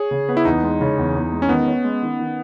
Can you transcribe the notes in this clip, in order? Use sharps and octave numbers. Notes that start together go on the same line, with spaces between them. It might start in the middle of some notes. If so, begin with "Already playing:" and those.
Already playing: G#4 C#5
C#3
B3
E4
E2 D#4
G#3
C#3
E2
E2
G#3
C#4
D#3 B3
C#4
G#3
D#3
D#3